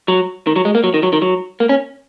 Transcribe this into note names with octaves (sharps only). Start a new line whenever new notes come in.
F#3
D#3
F#3
G#3
A#3
F#3
D#3
F#3
D#3
F#3
A#3
C#4